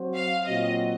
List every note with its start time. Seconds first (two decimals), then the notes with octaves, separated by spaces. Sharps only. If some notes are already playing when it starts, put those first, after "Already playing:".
Already playing: F#3 C4 F#4 C5
0.14 F5
0.45 A#2 F#3 C4 F#4 D#5